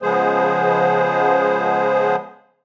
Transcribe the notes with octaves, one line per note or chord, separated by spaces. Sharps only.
C#3 F3 G#3 B3 G#4 C5